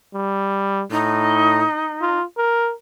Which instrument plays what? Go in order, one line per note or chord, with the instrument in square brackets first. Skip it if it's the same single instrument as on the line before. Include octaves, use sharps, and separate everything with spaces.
[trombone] G3
[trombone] A2 [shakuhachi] D#4
[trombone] F4
A#4